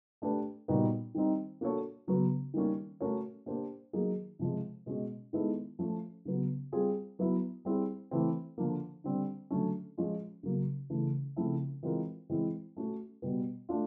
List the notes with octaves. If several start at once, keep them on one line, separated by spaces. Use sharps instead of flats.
A3 D4 G4 B4
A#2 G3 B3 D#4 F#4
D#3 G3 C4 D#4
A#3 D4 F#4 A4 C#5
C#3 F#3 B3
D#3 G3 A#3 C#4
A3 C#4 F#4 A#4 C#5
A#3 D4 G4 C5
D#3 F#3 A#3 D#4 G#4
C3 F3 G#3
B2 G#3 C#4
D#3 G#3 B3 E4 A4
F3 A3 C#4
C#3 F#3 B3
G3 C4 F4 G#4
F#3 B3 E4
G3 C4 E4 G#4
E3 A3 C4
D3 F3 A#3
D3 G3 C4
D3 F#3 A3 C#4
F3 G#3 C#4 F4
C#3 F#3 A#3
C#3 E3 A3
C#3 F3 A3 C4 E4
E3 G#3 C4 F4 A#4
E3 G#3 C4 E4
A3 C#4 F#4
B2 G3 B3
A3 D4 F4